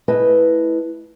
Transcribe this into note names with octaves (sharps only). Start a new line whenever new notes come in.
A3 E4 B4 D#5 A5